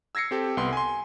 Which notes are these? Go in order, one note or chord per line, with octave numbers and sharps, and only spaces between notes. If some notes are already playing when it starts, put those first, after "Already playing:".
E6 G#6 A#6 C7 C#7
C4 G4 A4
C2 B3 C6
G#5 C6